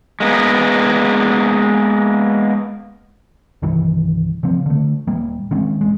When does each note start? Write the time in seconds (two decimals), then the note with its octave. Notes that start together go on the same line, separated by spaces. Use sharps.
0.20 G#3 A#3 B3
3.62 C2 G2 D#3 E3
4.43 C#3 F3 C4
4.66 D3 A3
5.07 D#1 G3 A#3
5.51 D#3 G#3 C4 C#4
5.81 D#1 B1 G#3